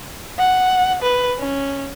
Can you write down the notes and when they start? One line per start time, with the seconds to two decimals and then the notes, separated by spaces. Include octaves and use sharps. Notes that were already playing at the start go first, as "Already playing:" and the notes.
0.39 F#5
1.02 B4
1.39 C#4